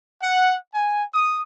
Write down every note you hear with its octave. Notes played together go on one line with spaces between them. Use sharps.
F#5
G#5
D#6